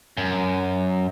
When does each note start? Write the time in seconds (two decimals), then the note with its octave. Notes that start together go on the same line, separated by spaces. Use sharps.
0.17 F#2